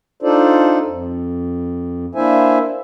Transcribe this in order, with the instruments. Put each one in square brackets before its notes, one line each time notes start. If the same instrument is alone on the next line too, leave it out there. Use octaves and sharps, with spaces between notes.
[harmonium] D4 D#4 F4 A4 C5 D5
F2
A#3 D4 E4 C5 E5 G#5